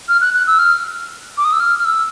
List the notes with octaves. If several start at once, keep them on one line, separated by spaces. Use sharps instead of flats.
F6
F#6
F#6
E6
F6
D6
D#6
E6
F6
F6
E6